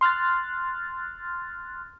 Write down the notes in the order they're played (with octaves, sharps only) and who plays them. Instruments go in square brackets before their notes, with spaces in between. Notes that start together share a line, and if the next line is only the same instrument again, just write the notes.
[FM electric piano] C6 F6 F#6 A6